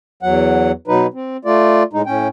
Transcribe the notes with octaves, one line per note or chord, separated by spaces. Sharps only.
E2 F#3 F#5
B2 F#3 D#4 B4
C4
A3 F4 D5
A2 G#3 D#4
A2 C#4 G5